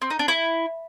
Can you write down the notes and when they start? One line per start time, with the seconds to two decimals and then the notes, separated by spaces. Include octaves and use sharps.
0.01 C4
0.10 D#4
0.19 D4
0.28 E4